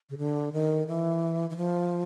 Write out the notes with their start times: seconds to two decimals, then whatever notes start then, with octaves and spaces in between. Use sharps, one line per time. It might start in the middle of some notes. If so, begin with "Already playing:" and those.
0.10 C#3
0.18 D3
0.53 D#3
0.87 E3
1.50 E3
1.57 F3